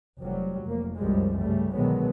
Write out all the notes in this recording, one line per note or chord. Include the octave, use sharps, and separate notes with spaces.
F1 F#3 G3
F1 A#3
C2 F#2 F3 G3 G#3
G2 C#3 G3 A3
B2 D3 D#3 F#3 G#3 B3